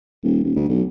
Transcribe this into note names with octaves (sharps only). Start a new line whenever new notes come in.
D#1
D#1
D2
B1